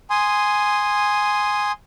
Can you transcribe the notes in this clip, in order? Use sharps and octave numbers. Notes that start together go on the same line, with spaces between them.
G#5 C6 D#6